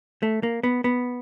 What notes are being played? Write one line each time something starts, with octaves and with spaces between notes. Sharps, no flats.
A3
A#3
B3
B3